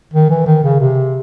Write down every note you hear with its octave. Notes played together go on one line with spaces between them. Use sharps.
D#3
E3
D#3
C#3
C3